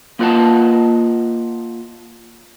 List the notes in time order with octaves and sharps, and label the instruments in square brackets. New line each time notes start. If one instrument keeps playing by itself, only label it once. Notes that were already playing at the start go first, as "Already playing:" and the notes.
[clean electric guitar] A#3 F4 B4 D#5 F#5 A5